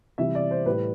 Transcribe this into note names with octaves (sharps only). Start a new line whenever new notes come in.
C3 E3 G3 E5
D5
C5
A2 G3 B4